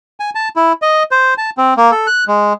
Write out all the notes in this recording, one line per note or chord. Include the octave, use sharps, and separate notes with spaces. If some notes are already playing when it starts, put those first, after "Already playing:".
G#5
A5
E4
D#5
C5
A5
C4
A#3
A4
F#6
G#3